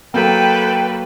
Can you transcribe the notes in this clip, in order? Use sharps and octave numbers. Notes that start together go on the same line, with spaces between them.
F#3 A#3 A4 B4 G5